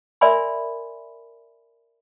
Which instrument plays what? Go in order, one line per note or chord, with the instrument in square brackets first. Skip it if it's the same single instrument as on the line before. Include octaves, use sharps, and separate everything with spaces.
[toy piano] A#4 D5 E5 G#5 B5 C6